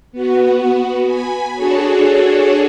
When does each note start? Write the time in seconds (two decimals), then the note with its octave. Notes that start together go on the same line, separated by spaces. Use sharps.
0.12 B3 F#4
1.06 G#5 B5
1.54 D4 F#4 G#4 A4 C#5